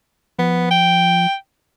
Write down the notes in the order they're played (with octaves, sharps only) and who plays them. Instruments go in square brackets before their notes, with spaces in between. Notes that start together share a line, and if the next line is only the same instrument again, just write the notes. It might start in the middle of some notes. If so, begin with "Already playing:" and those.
[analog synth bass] F3 [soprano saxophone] B3
[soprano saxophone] G5